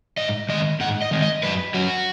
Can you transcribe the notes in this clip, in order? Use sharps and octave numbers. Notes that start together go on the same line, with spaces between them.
G#2 D#5
D#3 G#3 D#5
G#2 F#5
D#5
D#3 G#3
D#5
F#2 B4
F#3 C#4 F#4